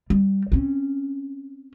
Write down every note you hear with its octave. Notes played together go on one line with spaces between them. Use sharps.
G3
C4 C#4